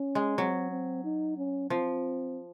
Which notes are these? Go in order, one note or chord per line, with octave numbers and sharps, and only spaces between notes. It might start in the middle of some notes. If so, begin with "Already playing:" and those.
Already playing: C#4
G#3
F#3 C4
C4
D#4
C#4
F3 C4